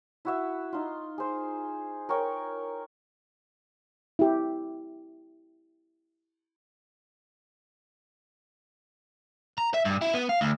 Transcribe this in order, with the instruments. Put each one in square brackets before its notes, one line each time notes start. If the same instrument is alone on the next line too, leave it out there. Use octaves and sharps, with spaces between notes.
[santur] E4 F#4 E5
D#4 F4
G#4 C5
A#4 C#5 G5 C#6
[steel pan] E4 G4
[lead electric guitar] A#5
E5
G2
E4
B3
F5
D2